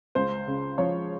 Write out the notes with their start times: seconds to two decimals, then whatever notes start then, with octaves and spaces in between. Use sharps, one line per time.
0.15 C#2 C5
0.47 C#3
0.78 F3 C#5